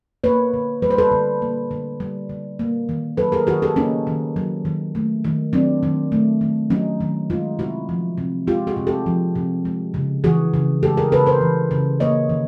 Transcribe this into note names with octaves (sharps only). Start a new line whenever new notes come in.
A#3 B4 C#5
D3
G3 B4
C5
A4 B4
D3
A#3
D3
G3
D3
A#3
D#3
F#3 A4 B4
G#4 A#4
D#3 F#4 G#4
G4 A4
A#3 C#4 D#4
D#3
F#3
D#3
A3
D#3
F#3 C4 D4
D#3
A3
D#3
F#3 C#4 D#4
D#3
G#3 D#4 F4
C3 E4 F#4
F3
C3
G#3 F4 G4
F#4 G#4
C3
G4 A4
F3
C3
G#3
C#3
E3 F#4 G#4
C#3
G#3 G4 A4
G#4 A#4
C#3 A4 B4
A#4 C5
E3
C#3
A#3 C#5 D#5
D#3